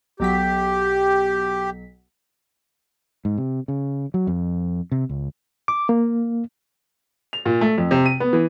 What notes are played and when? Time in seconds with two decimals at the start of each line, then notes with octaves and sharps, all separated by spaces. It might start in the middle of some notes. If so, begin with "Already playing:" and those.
0.20 B1 F#3 G4 B6
3.25 G#2
3.38 C3
3.68 C#3
4.14 F#3
4.27 F2
4.92 C3
5.09 C#2
5.68 D6
5.89 A#3
7.33 F7
7.46 A#2
7.61 A3
7.78 F2
7.91 C3
8.06 D#7
8.20 B3
8.33 E3